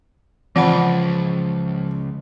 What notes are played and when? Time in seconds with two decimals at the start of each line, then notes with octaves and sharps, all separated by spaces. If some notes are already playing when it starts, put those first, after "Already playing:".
0.56 C#2 E3 F3 F#5 B5